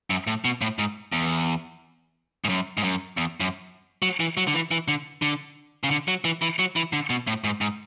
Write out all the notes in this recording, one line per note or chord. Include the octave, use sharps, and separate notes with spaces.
F#2
A2
B2
A2
G#2
E2
G#2
F#2
G#2
F#2
E2
F#2
F#3
E3
F#3
D3
E3
E3
D3
D3
C#3
D3
F#3
E3
E3
F#3
E3
D3
B2
A2
G#2
G#2